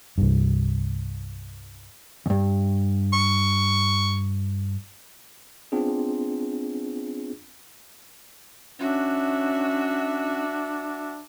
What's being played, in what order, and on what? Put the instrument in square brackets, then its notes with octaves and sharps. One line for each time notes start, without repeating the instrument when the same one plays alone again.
[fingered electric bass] C2 G2
[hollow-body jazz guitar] E2 G2
[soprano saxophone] C#6
[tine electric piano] B3 C4 D4 F4 G#4
[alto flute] C#4 [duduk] D4 [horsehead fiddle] F#4 E5